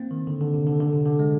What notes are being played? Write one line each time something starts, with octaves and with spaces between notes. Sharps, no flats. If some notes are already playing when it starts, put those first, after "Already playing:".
Already playing: A#3 C4
D#3
D3
D3
C3
D3
D3
C3
D3
G#3